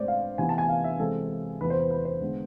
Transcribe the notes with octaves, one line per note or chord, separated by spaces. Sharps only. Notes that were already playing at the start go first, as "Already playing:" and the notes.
Already playing: A2 G#3 C4 C5 D5
F5
C3 E3 B3 G#5
A5
G#5
F5
E5
C3 E3 G#3 C4 A4
E2 C3 E3 B3 B4
C5
B4
B4
C5
D3 G#3 B3